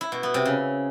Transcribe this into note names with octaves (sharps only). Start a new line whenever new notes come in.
E4
B2
B3
C3
C#3